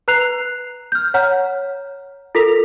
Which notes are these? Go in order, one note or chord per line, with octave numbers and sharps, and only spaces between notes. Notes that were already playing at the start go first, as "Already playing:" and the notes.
B4 A#5 F#6 C7 F7
F6 G6
C#5 F#5 A#5 F6
F4 A4 A#4 B6 F7